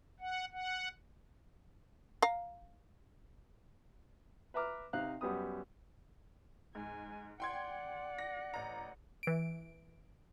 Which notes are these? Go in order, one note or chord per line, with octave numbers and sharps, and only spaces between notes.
F#5
F#5
F5 A#5
B4 E5 A#5 D6 F6
C3 D#4 F5 F#6
F#2 G3 B3 D#6
G#2 G#5
D5 F#5 G5 C6 G#6
A#6
A1 A#5
E3 D7